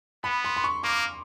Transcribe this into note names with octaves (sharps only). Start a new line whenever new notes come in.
B3 B5
C6
C6
C#6
A#3 D6